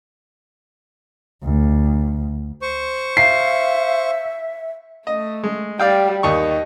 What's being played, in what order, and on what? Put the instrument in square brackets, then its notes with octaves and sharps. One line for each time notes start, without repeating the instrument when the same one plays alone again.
[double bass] D2
[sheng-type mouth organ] C5 C#6
[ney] E5 [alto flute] F5 [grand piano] C7
[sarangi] A3 [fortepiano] D#5
[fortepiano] G#3
[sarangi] G3 [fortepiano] D5 F5 G5
[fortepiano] D#2 D#3 C#6 [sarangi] D#5